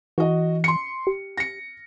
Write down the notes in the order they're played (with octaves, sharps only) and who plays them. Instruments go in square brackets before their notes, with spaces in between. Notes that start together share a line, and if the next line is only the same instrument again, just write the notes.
[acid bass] E3 [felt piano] F#4 D#5
[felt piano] C6 C#7
[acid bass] G4
[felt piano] A#6 C#7